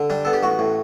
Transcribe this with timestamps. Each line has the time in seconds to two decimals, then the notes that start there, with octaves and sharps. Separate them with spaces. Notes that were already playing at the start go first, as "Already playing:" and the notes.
Already playing: D3
0.10 G3 D4
0.25 B3 A4
0.33 G4
0.43 A1 F#4
0.59 A2